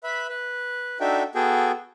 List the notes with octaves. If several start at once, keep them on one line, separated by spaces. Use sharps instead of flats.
B4 E5 B5
B4
D4 D#4 F#4 A4 E5 G5
B3 F#4 G#4 A4 G5